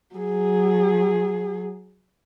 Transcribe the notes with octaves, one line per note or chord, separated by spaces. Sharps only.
F#3 G#4